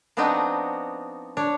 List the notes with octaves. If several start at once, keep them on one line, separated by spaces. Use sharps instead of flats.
F3 B3 C4 D4 D#4 F#4
D4 C#5